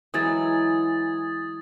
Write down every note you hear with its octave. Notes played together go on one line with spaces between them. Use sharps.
E3 F#3 G#3 D#6 G#6 A6